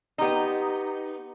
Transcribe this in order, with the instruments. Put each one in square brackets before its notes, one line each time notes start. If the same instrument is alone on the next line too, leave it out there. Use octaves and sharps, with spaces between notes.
[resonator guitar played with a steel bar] B3 D#4 [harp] G4 A#5 C6